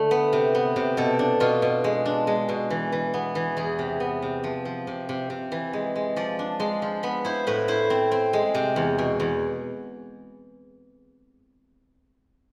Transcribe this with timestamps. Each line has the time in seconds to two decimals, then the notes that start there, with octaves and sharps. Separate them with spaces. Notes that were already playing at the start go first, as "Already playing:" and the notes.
Already playing: D3 A3
0.11 B3
0.33 C3
0.55 B3
0.76 C3
0.97 B2 A4
1.19 D4
1.40 B2 F4
1.62 B2
1.84 G#3
2.06 D4
2.27 G#3
2.49 B2
2.70 E3
2.92 E3
3.14 B3
3.35 E3
3.57 E2 G#4
3.79 C3
4.00 B3
4.22 C3
4.44 F3
4.65 F3
4.87 C3
5.09 C3
5.30 C3
5.52 E3
5.73 G#3
5.96 G#3
6.16 F3 D5
6.39 D4
6.60 G#3 C6
6.82 F3
7.03 B3 B5
7.25 E4 C5
7.47 A2 B4
7.68 E4 C5
7.90 C4
8.12 C4
8.33 G#3
8.55 C3
8.76 E2
8.98 B2
9.20 E2